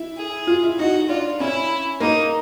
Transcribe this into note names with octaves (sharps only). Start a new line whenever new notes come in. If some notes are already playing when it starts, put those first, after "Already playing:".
Already playing: E4
G#4
F4
E4
D#4 F#4
D4 F4
C#4 E4
A#3 D#4